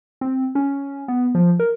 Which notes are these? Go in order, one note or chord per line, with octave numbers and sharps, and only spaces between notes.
C4
C#4
B3
F3
A#4